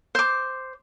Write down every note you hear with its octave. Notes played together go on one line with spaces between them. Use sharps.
C5 D6